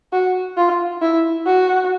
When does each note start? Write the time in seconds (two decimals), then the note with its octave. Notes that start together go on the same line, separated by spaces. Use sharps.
0.13 F#4
0.57 F4
1.02 E4
1.46 F#4